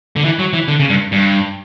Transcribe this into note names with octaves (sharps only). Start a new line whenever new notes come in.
D3
E3
F#3
E3
D3
C#3
G2
G2